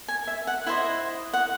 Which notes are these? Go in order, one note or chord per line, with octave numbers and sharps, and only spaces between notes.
G#5
E5
F#5
E4 C5 D#5 E5
F#5